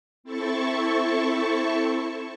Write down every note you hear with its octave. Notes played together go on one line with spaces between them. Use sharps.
C4 E4 A4 A5 C#6